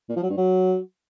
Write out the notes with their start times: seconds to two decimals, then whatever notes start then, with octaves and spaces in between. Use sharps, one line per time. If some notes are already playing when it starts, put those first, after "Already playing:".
0.09 A#2
0.16 F3
0.23 F#3
0.30 G2
0.37 F#3